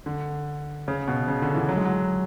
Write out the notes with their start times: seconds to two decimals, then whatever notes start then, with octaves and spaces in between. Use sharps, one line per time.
0.06 D3
0.88 C#3
1.08 B2
1.28 C#3
1.42 D3
1.55 E3
1.69 F#3
1.76 G#3
1.85 F#3